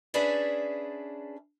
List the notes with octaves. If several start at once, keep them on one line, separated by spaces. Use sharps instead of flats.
C#4 D4 G#4 B4 D5 E5